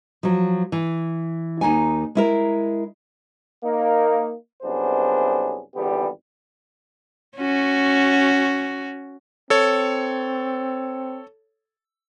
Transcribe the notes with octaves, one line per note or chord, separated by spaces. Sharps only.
F3 F#3
E3
D#2 D#4 G#5
G#3 E4 A#4
A#3 D#4 A#4
C2 F#2 B3 D4 G#4 C5
G#1 E2 D3 G3 B3 G4
C#4 F#4
C4 A4 C#5